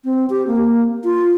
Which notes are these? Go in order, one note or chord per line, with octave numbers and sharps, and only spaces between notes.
C4
G4
A#3
F4